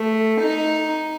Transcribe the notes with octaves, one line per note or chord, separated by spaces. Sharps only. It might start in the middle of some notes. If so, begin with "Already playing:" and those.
Already playing: A3
D#4